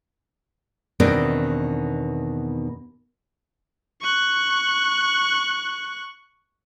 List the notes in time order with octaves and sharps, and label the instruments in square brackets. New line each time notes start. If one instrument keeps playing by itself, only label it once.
[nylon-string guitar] E2 B2 D#3 C4 D4 D#4
[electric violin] C#6 F#6